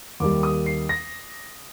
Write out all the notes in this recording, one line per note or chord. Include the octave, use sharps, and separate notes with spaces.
D#2 D#3 G3 D6
D#6
C7
A#6